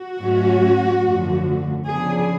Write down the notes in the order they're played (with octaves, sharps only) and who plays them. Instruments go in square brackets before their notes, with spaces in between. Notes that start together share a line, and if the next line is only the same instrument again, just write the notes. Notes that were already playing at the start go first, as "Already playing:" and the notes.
Already playing: [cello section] F#4
G#2 F#3 A3 C#4
F#2 D3 F3 A3
C#3 F3 B3 D4 G#4